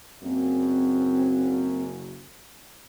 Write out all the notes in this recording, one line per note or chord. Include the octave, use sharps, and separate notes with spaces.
F#1 F#2 C4